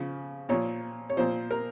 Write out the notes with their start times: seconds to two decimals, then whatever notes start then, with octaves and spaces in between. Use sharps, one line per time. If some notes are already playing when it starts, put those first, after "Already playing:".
Already playing: C#3 F3
0.49 A#2 F3 C#5
1.10 C#5
1.17 A#2 F3 C5
1.51 A#4